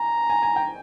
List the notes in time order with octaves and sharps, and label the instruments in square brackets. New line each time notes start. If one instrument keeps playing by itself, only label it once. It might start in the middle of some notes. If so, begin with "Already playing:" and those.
Already playing: [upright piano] G#5 [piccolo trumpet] A#5
[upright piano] G#5
G#5
G5